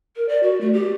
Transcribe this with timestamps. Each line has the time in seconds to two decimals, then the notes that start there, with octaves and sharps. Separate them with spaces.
0.16 A#4
0.29 D5
0.43 F#4
0.61 A3
0.73 G4